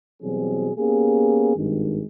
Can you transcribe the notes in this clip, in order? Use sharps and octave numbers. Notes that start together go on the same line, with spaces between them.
B2 E3 F#3 G3 C4 G#4
A#3 B3 C#4 G4 G#4
G#1 G2 D#3 G#3